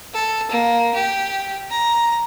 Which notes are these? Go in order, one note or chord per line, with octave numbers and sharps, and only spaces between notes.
A4
A#3
G4
A#5